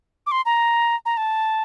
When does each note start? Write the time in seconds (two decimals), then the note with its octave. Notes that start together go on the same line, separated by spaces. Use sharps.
0.26 D6
0.32 C6
0.46 A#5
1.05 A#5
1.17 A5